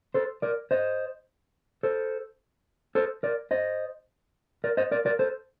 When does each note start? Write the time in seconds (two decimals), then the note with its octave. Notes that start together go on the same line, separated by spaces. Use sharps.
0.14 A4 C5
0.42 A#4 D5
0.71 C5 D#5
1.83 A4 C5
2.95 A4 C5
3.23 A#4 D5
3.51 C5 D#5
4.64 A#4 D5
4.77 C5 D#5
4.91 A#4 D5
5.06 A#4 D5
5.19 A4 C5